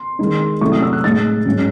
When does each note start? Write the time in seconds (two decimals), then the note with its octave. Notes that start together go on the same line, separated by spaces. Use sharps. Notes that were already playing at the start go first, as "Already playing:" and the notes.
Already playing: C6
0.19 D#3 G#3 D#4
0.61 C3 F#3 A3 C#4 E4 C#6
0.72 D#6
0.82 E6
0.93 F#6
1.04 A2 G#3 D#4 A6
1.46 G#2 F#3 C#4